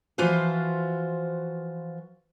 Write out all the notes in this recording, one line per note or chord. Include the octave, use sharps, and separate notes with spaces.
E3 F3 F4 F#4 B4 C5